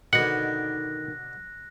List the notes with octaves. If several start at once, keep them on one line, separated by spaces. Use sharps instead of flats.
B2 D3 D#3 D#4 F#5 F#6 A#6